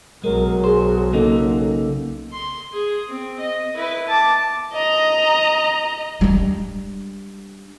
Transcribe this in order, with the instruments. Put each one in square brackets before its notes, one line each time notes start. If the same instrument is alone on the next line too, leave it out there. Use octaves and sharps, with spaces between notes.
[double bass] B1 F#3 [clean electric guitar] G#3 [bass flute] A#4
[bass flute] G#4 [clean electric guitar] C5
[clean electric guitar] C#3 A#3 D#4 [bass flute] A4
[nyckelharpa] C6
G#4
C4
D#5
E4 B4
A5 D6
[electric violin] D#5 A#5
[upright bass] G3 D4